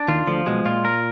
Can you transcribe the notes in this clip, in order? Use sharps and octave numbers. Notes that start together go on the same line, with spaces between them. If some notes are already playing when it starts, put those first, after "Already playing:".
Already playing: D4
D#2 D#3 F4
D2 D3 F3
B1 B2 G#3
A#2 F4
A#4